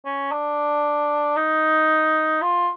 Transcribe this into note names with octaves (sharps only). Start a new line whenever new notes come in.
C#4
D4
D#4
F4